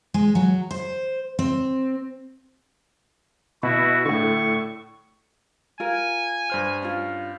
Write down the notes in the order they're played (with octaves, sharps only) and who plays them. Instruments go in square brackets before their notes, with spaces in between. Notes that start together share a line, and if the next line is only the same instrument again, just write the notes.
[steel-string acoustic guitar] G#3
F#3
C5
C4
[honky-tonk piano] B2 [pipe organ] E4 F#4
[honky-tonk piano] A2 D3 [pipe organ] C#6
[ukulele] F4 A#4 [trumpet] G#5
[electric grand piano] G2 C5 F6
[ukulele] C#4 F4